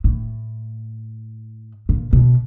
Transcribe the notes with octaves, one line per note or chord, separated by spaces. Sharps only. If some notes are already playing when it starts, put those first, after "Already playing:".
A2
A#2
B2